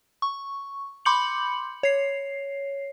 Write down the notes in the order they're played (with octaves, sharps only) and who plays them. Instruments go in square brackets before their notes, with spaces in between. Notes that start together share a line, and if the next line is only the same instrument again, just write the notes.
[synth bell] C#6
B5 C6 D6 G6 C#7 F#7
C#5 C7